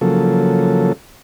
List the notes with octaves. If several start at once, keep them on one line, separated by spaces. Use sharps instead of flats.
C#3 F3 F#3 A#3 A4